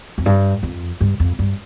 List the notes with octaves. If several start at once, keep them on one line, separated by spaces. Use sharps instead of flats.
F2
G2
F2
G2
F2
G2